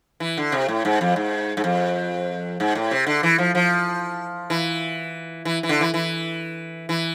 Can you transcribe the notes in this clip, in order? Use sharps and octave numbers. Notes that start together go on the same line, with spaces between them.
E3
D3
C3
A2
G#2
F2
G#2
G#2
F2
G#2
A2
C3
D3
E3
F3
F3
E3
E3
E3
D3
E3
E3
E3